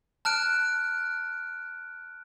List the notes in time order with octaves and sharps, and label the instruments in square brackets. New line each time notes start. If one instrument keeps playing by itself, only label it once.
[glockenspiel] A5 F6 F#6 D7